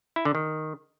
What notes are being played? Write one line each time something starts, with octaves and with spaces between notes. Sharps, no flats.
E4
D3
D#3